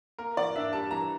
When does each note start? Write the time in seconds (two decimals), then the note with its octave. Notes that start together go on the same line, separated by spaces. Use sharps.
0.18 A#3 A#4
0.37 E3 D5
0.56 D4 E5
0.73 G3 A5
0.91 E3 A#5